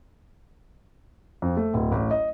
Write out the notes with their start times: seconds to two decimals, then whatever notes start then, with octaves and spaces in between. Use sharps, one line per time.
1.42 F2
1.57 A3
1.74 D1
1.92 A1
2.11 D#5